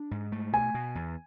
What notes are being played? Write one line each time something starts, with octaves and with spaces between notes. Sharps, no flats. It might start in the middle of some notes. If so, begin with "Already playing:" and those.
Already playing: D4
G#2
A3
B2 G#5
B2
E2